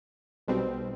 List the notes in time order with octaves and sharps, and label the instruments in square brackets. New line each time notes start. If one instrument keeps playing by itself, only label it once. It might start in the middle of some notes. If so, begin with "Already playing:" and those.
[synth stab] B1 B2 G3 C4